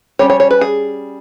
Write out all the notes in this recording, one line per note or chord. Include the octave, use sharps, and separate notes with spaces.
G3 C#4 C#5
C#5
C#5
B4
G#4